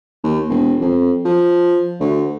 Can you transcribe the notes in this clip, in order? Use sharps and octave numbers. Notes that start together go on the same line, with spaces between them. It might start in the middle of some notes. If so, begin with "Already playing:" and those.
D#2
E1
F2
F3
D2